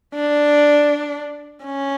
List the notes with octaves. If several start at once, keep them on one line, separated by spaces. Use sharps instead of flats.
D4
C#4